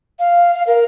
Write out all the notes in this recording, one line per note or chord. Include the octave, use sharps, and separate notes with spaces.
F5
F5
A#4